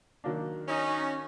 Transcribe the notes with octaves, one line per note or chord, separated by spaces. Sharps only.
D#3 F#3 A#3 D4
C#4 D#4